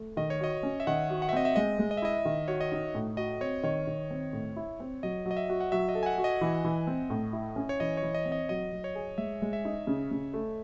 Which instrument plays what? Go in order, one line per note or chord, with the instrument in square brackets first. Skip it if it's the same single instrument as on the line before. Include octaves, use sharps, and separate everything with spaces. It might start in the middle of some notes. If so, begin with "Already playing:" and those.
Already playing: [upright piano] A3
[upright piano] D#3 [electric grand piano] D#5
[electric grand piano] C#5
[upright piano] F#4 [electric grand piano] D#5
[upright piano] C#4
[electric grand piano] E5
[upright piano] D#3 [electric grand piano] F#5
[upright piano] F#4
[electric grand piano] F#5
E5
[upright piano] C4 [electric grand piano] D#5
[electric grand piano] E5
[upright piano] G#3 [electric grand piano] D#5
[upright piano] G#3
[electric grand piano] D#5
E5
[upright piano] E4 [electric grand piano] D#5
[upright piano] D#3
[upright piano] F#4 [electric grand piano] C#5
[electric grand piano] D#5
[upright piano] D#4
A2
[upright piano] F#4 [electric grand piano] D#5
[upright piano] C4 [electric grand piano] C#5
[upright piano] D#3 [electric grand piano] C#5
[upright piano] D#3
C4
A2
E4
C4
[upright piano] F#3 [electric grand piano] D#5
[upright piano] F#3
[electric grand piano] D#5
E5
[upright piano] F#4
[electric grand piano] F#5
[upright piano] F#3 [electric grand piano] E5
[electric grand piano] D#5
[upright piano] A4
[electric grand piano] G#5
F#5
[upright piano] F#4
[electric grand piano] D#5
[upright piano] E3
E3
C4
A2
E4
C#4
[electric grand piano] C#5
[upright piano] E3 [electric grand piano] D#5
[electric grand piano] C#5
[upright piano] E3
[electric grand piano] D#5
[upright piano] C4
[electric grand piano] D#5
[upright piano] F#3 [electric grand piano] D#5
[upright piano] F#3
[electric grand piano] C#5
[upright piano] G#4
[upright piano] G#3 [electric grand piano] E5
[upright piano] G#3
[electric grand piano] E5
[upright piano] D#4
C#3
C#3
A3